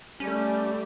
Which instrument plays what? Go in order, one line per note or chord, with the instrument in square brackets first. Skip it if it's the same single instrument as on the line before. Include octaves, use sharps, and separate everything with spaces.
[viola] G3 A3 [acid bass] C#4 [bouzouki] A4 C#5 D5